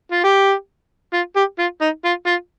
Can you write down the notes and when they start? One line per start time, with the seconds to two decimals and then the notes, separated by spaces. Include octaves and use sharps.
0.12 F4
0.24 G4
1.13 F4
1.36 G4
1.59 F4
1.81 D#4
2.05 F4
2.27 F4